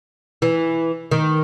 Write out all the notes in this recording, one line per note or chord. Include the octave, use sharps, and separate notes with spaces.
E3
D#3